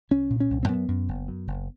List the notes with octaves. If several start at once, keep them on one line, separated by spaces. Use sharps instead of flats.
C2 C#4
A#2
C#4
C2
C4
F#2 B3
F#2
F#1
F#2
F#1